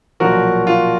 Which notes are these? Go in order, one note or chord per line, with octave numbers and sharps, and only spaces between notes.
B1 A#2 F3 F#4 A#4
F4